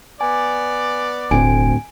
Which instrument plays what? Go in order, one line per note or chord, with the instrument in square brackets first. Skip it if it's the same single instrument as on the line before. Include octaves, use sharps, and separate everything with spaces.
[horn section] B3 D5 [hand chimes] G#5
[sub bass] E1 [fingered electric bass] D2 A2 C4 [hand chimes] G#5 D7